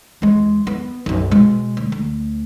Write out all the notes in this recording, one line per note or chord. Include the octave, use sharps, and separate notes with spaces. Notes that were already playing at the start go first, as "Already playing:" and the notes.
E2 G#3
B3
B1 F#2
B2 G#3
D2
D2